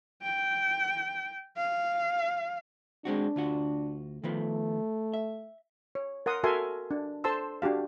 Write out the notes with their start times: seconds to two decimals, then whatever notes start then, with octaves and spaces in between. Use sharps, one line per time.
0.22 G5
1.57 F5
3.05 G#3 C4 D4 F#4
3.36 D2 F4 F#4
4.24 D#3 F3 A3 B3
5.13 E5
5.95 C#5
6.26 A#4 F#5 C6 D#6
6.44 F#4 A4 A#4 E5 G#5 C6
6.91 D4
7.24 A4 C5 A5 C6 E6
7.62 D4 F#4 G4 F5